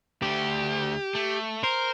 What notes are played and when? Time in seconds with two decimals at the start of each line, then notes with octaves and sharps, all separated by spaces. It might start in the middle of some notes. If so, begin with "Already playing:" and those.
0.22 D2 A3 G4
1.15 A3
1.64 A#4 C5